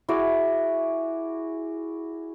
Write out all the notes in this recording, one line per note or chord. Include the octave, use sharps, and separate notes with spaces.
E4 F#4 G#4 D5